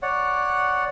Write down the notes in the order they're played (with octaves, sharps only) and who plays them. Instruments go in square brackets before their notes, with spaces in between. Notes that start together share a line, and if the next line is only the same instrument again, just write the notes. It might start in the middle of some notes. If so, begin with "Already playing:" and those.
[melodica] C#5 D5 F#5